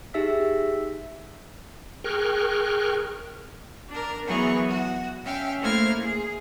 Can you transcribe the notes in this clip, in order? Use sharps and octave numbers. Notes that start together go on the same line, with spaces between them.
D#4 G4 G#4 E5 E6 B6
G#4 A#4 G5 C#6 F6 F#6
D4 A#4
E3 F#3 B3 G#4 C#6
F#4
C#4 E5 F5 G5
A3 A#3 E4 C5 F6 G#6
G#4